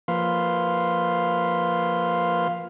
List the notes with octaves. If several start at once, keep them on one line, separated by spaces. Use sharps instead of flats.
F3 A#3 B4 F5 C6